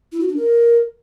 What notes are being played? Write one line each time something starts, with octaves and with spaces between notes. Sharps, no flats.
E4
F#4
D4
A#4